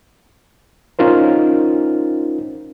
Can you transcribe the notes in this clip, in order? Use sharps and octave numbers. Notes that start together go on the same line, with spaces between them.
C#4 D#4 F4 A#4 C5